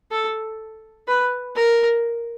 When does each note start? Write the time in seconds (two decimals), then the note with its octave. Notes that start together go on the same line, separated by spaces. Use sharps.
0.11 A4
1.08 B4
1.56 A#4